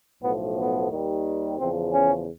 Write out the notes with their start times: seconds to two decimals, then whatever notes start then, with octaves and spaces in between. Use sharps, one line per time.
0.20 B1 A2 F3 B3
0.55 B3
0.89 D#2 D#3 G3
1.57 E2 C#3 F3 C4
1.91 C#4